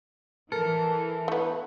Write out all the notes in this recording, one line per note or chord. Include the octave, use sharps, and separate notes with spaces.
E3 A4 A#4
A3 B3